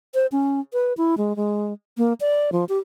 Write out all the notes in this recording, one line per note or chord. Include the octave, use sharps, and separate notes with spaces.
C5
C#4
B4
E4
G#3
G#3
A#3
D5
F3
G4